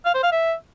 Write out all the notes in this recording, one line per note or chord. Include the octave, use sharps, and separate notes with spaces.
F5
C5
F5
E5